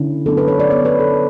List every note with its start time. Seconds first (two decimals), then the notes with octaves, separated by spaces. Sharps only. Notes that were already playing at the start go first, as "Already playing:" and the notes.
Already playing: D3 C#4 E4
0.26 F#3 B3 D4 A4
0.37 B4
0.48 C#5
0.60 D5
0.70 F#3 B3 D4 C#5
0.85 B4
1.00 A4